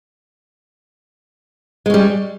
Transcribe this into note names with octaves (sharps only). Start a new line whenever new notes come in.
G3 G#3 C#4